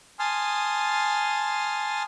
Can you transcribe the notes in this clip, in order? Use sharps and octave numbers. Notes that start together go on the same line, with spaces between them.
G#5 A5 C6 D#6 F6